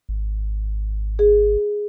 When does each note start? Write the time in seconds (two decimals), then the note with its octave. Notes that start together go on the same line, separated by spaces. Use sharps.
0.09 G#1
1.19 G#4